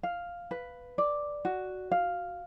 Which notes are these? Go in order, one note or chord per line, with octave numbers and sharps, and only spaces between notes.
F5
B4
D5
F#4
F5